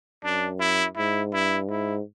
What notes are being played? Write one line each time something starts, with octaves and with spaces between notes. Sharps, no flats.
F#2 D4
E4
G#2 E4
G2 E4
G#2 E4